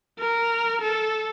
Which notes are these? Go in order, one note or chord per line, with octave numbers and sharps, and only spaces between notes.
A#4
A4